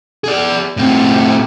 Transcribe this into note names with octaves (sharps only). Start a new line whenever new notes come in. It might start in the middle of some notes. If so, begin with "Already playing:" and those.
G#4 D5
A2 C4